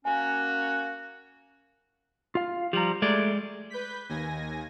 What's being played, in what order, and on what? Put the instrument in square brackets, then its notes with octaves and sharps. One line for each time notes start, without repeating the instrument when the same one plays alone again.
[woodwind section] A#3 C#4 F#4 [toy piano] G#5
[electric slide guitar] F4 F5
[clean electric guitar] F3 G3 [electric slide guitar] G4 A#5
[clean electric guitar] G#3 D5 [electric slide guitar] A3
[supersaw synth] B4 G6 B6
D#2 G#5 A#6